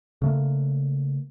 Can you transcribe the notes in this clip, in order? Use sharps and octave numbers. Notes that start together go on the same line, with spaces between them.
C#3 A3 A#3